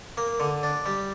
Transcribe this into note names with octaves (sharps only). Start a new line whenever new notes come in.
A#3
D3
D4
G3